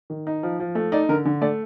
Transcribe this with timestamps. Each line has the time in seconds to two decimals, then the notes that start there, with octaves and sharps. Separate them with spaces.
0.10 D#3
0.27 D#4
0.43 F3
0.60 F3
0.75 A3
0.92 D#4 D5
1.09 D3 A#4
1.25 D3
1.42 A3 D5